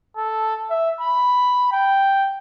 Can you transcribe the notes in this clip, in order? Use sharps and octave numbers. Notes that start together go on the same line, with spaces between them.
A4
E5
B5
G5